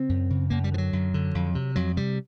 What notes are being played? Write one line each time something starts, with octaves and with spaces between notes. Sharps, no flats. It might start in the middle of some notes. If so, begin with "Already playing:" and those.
Already playing: C#3 C4
F#2
C#3
F#2 A#3
G3
D3 F3
F#3
F#2
D3
F2
C3
F2 F#3
C3 G3